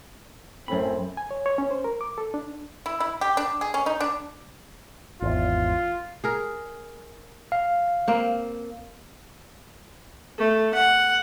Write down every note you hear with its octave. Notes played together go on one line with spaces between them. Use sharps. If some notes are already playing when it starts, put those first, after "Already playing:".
F#2 A2 C4 C#4 B5
G#5
C#5
C#5
C#4
C5
A#4
D6
A4
D4
E4
E4
G4
D4
G#4
C#4
D#4
D4
G#1 E2 F4
G#4 A#4
F5
A#3 C4
A3
F#5